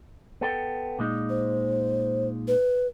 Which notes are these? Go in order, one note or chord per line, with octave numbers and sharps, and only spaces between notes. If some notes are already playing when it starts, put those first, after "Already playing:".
B3 A4 G5
A#2 G#3 D#4
C5
B4